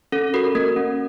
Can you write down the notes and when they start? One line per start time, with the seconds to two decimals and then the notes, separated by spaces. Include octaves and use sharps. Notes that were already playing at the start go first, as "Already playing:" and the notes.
0.12 C#4 A4
0.34 F#4 A#4
0.55 A#3 A#4
0.76 C#4